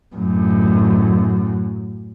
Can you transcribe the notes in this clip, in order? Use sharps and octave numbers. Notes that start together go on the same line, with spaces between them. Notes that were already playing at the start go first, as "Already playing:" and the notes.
F#2 A2